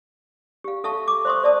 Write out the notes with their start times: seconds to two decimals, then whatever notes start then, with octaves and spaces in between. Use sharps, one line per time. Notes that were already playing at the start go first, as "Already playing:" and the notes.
0.64 G4 F5
0.84 A4 E5 F5 A5 C#6
1.08 D6
1.25 C5 E5 C6 C#6 D#6
1.43 C5 D5 E5 A5 D#6